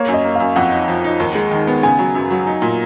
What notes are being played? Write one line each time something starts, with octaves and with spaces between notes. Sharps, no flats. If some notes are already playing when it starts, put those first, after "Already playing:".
Already playing: A#3 C#5
F#2
D#5
A#3
F#2 F5
F2 F#5
D#4
F3
D#4
D#2
G#3
D#3
B3
C#3 G#5
F#3
F#2
F#3
D#4
A#2